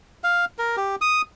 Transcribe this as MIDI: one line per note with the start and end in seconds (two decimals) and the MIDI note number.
0.24 0.45 77
0.59 0.76 70
0.77 0.96 67
1.01 1.22 87